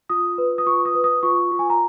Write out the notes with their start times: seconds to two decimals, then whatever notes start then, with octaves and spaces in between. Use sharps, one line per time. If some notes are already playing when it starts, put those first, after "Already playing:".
0.10 F4 D#6
0.38 B4
0.58 D#6
0.66 F4 C#6
0.85 D#6
0.95 B4
1.04 D#6
1.23 F4 C#6
1.51 F4
1.59 G#5
1.70 A#5